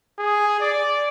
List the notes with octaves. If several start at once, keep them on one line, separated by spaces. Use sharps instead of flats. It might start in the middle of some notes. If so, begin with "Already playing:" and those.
G#4
D5